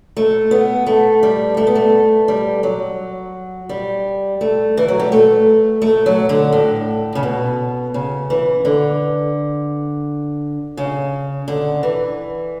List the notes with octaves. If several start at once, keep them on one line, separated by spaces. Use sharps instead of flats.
A3
B3
A3
G3
A3
B3
A3
G3
F#3
G3
A3
E3
F#3
G3
A3
A3
F#3
D3
A2
C#3
B2
C#3
E3
D3
C#3
D3
E3